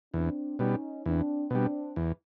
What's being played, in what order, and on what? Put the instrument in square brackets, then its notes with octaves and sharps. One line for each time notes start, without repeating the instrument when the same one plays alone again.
[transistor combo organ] E2 [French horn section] C4 D4
[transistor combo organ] B2 G3 [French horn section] C#4 D#4
[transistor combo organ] E2 [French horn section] C4 D4
[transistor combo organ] B2 G3 [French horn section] C4 D4
[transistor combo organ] E2